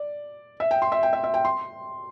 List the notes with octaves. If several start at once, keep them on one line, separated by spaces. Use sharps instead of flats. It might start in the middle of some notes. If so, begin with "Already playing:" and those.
Already playing: D5
E5
G5
C6
E5
G5
E5
E5
G5
C6